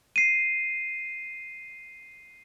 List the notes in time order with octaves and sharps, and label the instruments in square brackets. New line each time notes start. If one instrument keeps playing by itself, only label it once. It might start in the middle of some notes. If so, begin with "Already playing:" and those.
[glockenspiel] C7 D#7